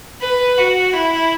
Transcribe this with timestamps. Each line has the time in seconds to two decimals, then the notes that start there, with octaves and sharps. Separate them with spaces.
0.21 B4
0.58 F#4
0.93 E4